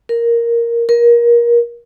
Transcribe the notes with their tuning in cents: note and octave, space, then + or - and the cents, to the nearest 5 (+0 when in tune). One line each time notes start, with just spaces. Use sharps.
A#4 +0
A#4 +25